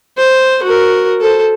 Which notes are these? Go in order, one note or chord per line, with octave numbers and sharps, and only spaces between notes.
C5
F#4 A#4
A4 C5